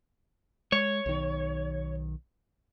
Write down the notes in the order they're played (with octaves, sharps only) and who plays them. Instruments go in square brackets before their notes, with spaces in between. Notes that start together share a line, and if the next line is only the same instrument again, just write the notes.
[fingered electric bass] G#3 [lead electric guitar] C#5
[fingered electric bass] B1 D#3